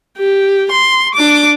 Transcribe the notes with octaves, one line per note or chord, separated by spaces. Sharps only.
G4
C6
D4 D6